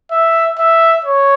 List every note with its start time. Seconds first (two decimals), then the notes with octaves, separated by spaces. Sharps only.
0.11 E5
0.59 E5
1.05 C#5